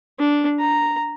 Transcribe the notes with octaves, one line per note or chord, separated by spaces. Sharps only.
D4
A#5